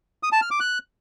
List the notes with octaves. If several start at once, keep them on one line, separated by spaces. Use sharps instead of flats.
D#6
A5
F6
D6
F#6